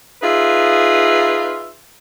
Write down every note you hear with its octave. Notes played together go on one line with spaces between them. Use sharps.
D#4 F4 G#4 B4 E5